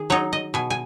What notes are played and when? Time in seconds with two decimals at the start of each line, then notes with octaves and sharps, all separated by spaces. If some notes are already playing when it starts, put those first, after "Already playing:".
Already playing: D#3 G#4
0.10 F#3 D#4 C#5
0.33 D#5
0.54 B2 G#5
0.70 G#5